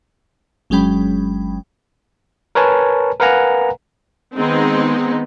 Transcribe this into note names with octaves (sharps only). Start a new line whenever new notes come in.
G1 F#3 G#3 C#4 G5 B5
A#4 B4 C#5 G#5 A5
A#4 B4 F5 F#5 G#5 A#5
D#3 G#3 B3 C4 D#4